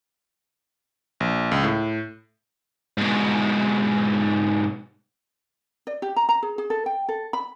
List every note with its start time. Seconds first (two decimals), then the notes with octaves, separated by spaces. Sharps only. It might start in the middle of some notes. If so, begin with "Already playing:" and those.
1.20 A#1
1.51 C#2
1.64 A2
2.97 G#2 B2
5.87 D5
6.02 G4
6.16 A#5
6.29 A#5
6.43 G#4
6.58 G#4
6.70 A4
6.86 G5
7.09 A4
7.33 B5